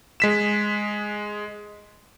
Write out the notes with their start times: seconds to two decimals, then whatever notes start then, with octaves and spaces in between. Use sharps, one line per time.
0.20 G#3 B6 E7